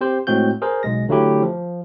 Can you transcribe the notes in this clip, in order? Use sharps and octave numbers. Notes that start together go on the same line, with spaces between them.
C4 G4 C5
A2 G#3 C4 F#4 G6
G#4 A#4 C5
B1 G#3 A#6
D3 F#3 A3 E4 G4
F3